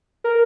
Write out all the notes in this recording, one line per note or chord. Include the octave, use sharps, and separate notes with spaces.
A#4